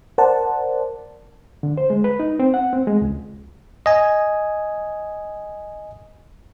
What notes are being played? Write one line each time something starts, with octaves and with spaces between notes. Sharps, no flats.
A#4 C5 D5 F#5 A5
D3
C5
G#3
B4
D#4
C4
F#5
C4
G#3
C#2
D#5 G#5